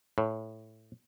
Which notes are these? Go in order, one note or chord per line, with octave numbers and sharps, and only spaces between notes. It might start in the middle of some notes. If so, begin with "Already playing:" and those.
A2